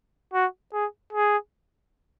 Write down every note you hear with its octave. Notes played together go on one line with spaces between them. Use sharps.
F#4
G#4
G#4